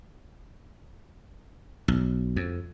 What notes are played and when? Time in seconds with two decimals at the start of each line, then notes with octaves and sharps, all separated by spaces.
1.88 B1
2.36 F2